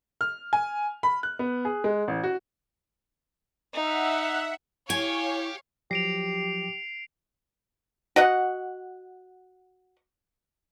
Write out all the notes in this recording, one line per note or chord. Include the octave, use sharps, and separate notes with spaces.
F6
G#5
B5
F#6
B3
G#4
G#3
A1
F#4
D#4 E5 F#5
E4 G4 C#5 F5 G#5
F3 F#3 G4 A#6 C7 D7 F7
F#4 D#5 F#5